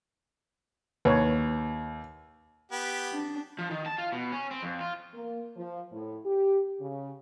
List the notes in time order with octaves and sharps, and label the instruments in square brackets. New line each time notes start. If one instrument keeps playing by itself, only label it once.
[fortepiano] D#2 [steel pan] B4 C#5
[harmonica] B3 G4
[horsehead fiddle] D4
[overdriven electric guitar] F3
D#3
A5
F4
B2
C#4
C4
F2
F4
[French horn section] A#3
F3
A2
G4
C#3